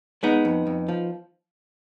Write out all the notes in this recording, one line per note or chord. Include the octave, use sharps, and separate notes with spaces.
G#3 B3 D#4
F2
F2
F3